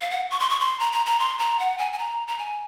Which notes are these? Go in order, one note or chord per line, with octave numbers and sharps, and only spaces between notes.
F5
F#5
C#6
C6
C#6
C6
A#5
A#5
A#5
C6
A#5
F#5
G#5
G#5
A#5
A#5
G#5